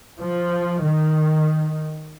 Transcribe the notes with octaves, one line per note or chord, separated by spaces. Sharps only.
F3
D#3